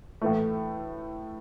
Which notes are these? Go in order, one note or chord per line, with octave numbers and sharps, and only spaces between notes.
A2 E3 A3